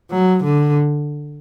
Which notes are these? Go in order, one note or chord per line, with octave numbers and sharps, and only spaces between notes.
F#3
D3